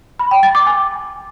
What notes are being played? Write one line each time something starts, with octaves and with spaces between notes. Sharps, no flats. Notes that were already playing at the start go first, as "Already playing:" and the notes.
B5
G5
A6
D6
G#5